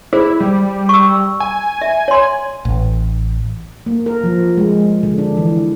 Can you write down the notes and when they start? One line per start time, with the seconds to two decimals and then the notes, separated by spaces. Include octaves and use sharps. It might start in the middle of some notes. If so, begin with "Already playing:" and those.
0.13 E4 G#4 C5
0.40 G3
0.89 C#6 E6
1.40 G#5
1.81 E5
2.08 C#5 C6
2.65 A1
3.86 A#3
4.06 A#4
4.24 F3
4.57 G#3
5.03 D3
5.18 D4
5.37 E3